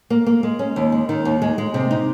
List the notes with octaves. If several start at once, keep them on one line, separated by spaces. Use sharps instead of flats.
A#3
A#3
G#3
C#4
D#2
G#3
D#3
D#2
G#3
G#3
C3
D#4